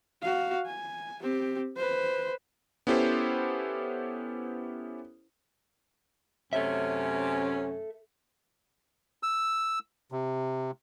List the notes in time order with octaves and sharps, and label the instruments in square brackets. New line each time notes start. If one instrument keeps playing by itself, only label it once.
[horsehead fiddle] F#4 F5
G#5
C4 G4
B4 C5
[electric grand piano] B3 C#4 E4 G4 A4 C5
[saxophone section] F#2 C3 C#4 [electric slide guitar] A4 E5
[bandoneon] E6
C3